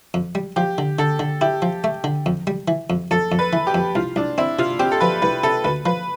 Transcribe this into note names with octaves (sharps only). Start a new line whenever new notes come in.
F2
G3
F3 G4
D3
D3 A4
D3
E4 G4
F3
A3
D3
F2
G3
E3
F2
F2 A4
F2
B4
E3
G4
F2
C2 F4
C2 D4
C4 E4
C3 F4
C4 G4
A4
F3 B4
C2 B4
C3 A4
D2 B4
F3 B4